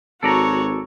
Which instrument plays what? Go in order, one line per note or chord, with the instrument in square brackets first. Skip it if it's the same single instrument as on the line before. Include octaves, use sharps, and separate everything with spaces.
[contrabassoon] G#1 [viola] F#4 C#5 [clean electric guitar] A4 D5 A#5